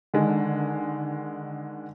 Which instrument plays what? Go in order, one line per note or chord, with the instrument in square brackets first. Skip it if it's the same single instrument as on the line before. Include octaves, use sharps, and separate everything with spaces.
[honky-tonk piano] D3 D#3 G#3